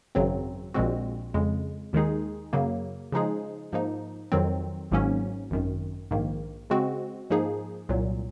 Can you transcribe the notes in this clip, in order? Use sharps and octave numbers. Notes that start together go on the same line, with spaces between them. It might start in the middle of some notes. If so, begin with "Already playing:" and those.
G#1 F#2 C#3 F#3 C4
A#1 A#2 G#3 C4 F#4
F2 C#3 G#3
D#2 D#3 G#3 D#4 G#4
F#2 C#3 F#3 A#3
C#3 F3 G#3 D#4 G#4
G#2 F3 A#3 D#4
F2 D#3 F#3 C4
G#1 G#2 F#3 A#3 C#4
G#1 F#2 D#3
A#1 G#2 D#3 A#3
C#3 G#3 C4 F#4
G#2 F3 A#3 D#4 G#4
C2 A#2 F#3